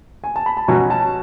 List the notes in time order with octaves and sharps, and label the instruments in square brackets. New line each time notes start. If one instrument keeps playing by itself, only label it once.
[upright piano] G#5
A5
B5
A5
[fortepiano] B2 F#3 C#4 [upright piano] G#5
[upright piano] A5